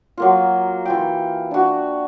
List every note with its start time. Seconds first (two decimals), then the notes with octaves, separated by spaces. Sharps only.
0.18 F#3 A#3 F4
0.86 E3 F4 G5
1.51 D4 F#4